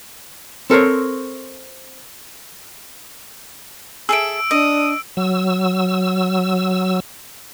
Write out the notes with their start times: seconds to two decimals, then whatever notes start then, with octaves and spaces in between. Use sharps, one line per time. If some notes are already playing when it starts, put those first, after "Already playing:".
0.70 C4 A4 A#4 C5 C#5
4.09 G#4 A4 E5 E6 D7
4.51 D4 D#5 D#6
5.17 F#3 E6